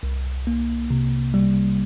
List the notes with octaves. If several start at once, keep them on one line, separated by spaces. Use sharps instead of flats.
C2
A#3
C3
G3